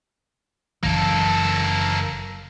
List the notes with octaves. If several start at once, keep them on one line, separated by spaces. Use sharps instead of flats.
F#1 E3 A#3 A4